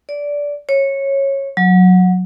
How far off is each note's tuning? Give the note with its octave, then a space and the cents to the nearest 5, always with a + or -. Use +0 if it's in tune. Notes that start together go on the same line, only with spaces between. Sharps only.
D5 -15
C#5 -15
F#3 -15